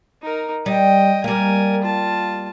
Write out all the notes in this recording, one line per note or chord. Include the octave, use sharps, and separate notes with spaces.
D#4 A#4
G3 D#5 G5
G3 A#3 A#4 G#5
F4 A5